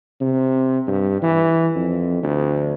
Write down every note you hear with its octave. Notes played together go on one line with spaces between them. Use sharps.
C3
G2
E3
F2
D2